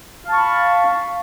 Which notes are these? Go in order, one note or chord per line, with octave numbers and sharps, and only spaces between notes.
F5 A5 B5 C#6